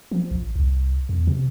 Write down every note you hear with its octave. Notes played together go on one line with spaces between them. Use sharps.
F3
A1
C2
E2
C3